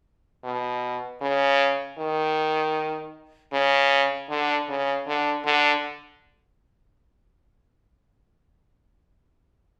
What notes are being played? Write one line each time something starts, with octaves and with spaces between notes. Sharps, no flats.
B2
C#3
D#3
C#3
D3
C#3
D3
D3